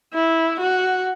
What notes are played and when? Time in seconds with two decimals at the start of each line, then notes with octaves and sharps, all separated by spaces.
0.14 E4
0.61 F#4